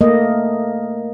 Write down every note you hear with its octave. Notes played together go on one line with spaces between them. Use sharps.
A3 A#3 D#5